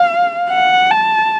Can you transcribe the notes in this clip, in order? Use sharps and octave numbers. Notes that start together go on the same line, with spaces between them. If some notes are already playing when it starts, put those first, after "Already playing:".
Already playing: F5
F#5
A5